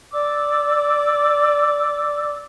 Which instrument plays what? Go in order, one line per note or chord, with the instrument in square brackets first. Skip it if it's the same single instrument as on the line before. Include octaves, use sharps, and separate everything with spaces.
[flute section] D5 D6 E6